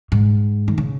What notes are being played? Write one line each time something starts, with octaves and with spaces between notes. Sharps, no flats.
G#2
D#3
C#3